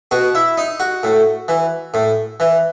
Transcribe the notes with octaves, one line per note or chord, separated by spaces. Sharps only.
B2 F#4
E4
D#4
F#4
A2
E3
A2
E3